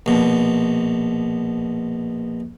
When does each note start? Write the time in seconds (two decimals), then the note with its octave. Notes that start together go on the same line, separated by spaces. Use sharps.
0.06 A#1 B2